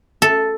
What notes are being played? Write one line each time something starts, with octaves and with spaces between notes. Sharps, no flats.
A4